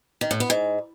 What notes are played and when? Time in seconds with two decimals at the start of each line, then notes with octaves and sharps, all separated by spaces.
0.21 D#3
0.31 A2
0.40 B3
0.50 G#2